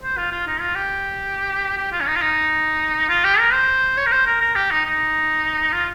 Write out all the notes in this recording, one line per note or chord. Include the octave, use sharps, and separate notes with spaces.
C5
F4
F4
D#4
F4
G4
G4
F4
C#4
D#4
F4
D#4
F4
G4
A#4
C5
C#5
A#4
C5
A#4
A#4
G4
D#4
D#4
F4